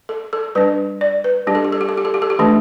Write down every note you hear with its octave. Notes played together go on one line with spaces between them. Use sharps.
A4
A4
G3 D4 B4
D5
B4
G3 D4 G4
A4
G4
A4
G4
A4
G4
A4
G4
A4
G4
E3 A3 D4 A4